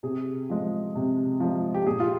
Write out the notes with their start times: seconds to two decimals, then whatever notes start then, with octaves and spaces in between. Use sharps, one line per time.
0.03 C3 G#4
0.50 F3 G#3
0.95 C3
1.40 F3 G#3
1.74 G4
1.85 A#2 G#4
2.00 F4